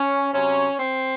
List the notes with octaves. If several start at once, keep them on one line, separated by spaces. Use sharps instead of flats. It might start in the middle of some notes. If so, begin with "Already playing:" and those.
Already playing: C#4
C3 F#3 C#4
C4